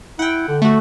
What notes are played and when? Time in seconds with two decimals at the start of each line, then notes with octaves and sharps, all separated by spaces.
0.19 E4 F#5 G5
0.48 D3
0.62 A3 F#4